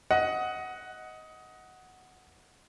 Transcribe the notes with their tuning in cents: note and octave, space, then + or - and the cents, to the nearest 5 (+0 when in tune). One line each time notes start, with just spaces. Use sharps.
D#5 +15 F#5 +0